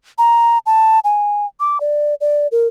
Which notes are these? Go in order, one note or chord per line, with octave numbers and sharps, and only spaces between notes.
A#5
A5
G#5
D6
D5
D5
A#4